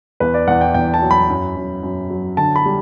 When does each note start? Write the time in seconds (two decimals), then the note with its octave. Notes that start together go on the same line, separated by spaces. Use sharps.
0.20 E2 B4
0.34 D5
0.47 E2 F#5
0.61 G5
0.74 E2 G5
0.94 A5
1.02 F#3
1.11 B5
1.30 F#2
1.56 F#2
1.83 F#2
2.10 F#3
2.37 D3 A5
2.56 B5
2.66 G3